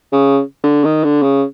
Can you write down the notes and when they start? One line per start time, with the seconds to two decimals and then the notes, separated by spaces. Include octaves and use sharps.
0.12 C#3
0.64 D3
0.84 D#3
1.04 D3
1.23 C#3